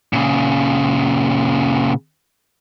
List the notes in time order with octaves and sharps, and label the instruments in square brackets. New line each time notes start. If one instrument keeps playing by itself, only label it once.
[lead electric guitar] A#2 C#3